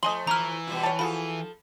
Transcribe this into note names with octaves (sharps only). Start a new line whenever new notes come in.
F3 A3 D#5 G#5 C6 F#7 G7
E3 A#5 F6
B2 G3 F4
C#5 A5
F3 F4 F#4 G#4 A4 B5